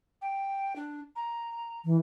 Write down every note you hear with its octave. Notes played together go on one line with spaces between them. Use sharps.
G5
D4
A#5
E3